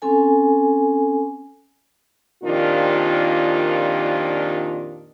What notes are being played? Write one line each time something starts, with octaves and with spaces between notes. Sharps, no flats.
C4 C#4 A4 G#5
F2 A#2 D#3 D4 F4 G4